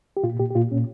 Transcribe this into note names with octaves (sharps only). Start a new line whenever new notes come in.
G4
A#2 F4
A#2 G4
G4
A#2 F4
A#2 C#4